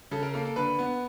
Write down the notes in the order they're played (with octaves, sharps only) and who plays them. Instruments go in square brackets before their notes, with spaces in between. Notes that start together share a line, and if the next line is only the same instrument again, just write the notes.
[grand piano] C#3 A4
A#4
A#3 A4
A4
D3 B4
B3